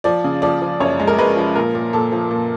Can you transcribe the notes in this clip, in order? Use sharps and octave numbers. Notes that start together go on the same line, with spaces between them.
F3 D5
C#3
F3 D5
F3
F#2 C#5
G#3
A#4
G#3 B4
F3
A#2 A#4
A#2
A#2 A4
F3
A#2